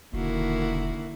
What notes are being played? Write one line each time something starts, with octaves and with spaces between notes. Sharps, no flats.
E1 D3 D#3 A#3 E4 F#4